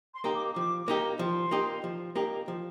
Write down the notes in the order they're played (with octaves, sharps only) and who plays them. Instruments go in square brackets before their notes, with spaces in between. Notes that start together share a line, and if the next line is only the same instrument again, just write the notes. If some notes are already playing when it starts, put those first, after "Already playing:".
[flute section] C6
[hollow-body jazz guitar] A#3 D#4 G4
[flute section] D6
[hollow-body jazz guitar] F3 [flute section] D6
[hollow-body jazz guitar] A#3 D#4 G4
[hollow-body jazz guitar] F3 [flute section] C6
[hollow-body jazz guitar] A#3 D#4 G4
F3
A#3 D#4 G4
F3